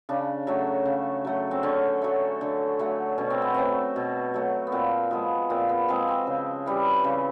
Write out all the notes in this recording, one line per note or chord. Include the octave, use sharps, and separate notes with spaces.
C#3 D4
F#3 A3
C#3
F#3 A3
C4
D3 C#4
F#3 A3
D3
F#3 A3
B2 C#4
C4
B3
F#3 A3 C4
B2
F#3 A3
B3
A#2 C4
F3 G#3 B3
A#2 C4
B3
F3 G#3 C4
C4
C#3
E3 G3
C#3